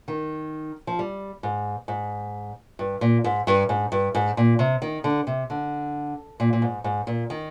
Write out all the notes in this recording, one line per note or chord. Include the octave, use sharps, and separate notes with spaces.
D#3
F3
G3
G#2
G#2
G2
A#2
G#2
G2
G#2
G2
G#2
A#2
C3
D#3
D3
C3
D3
A#2
A#2
G#2
G#2
A#2
D#3